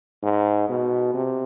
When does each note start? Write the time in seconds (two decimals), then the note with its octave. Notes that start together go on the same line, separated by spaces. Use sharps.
0.23 G#2
0.69 B2
1.14 C3